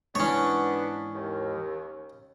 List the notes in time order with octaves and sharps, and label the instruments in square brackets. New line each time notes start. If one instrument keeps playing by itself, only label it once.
[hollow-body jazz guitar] G#2 E3 [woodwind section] B3 D4 [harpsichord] C#4 C#5
[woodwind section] D#2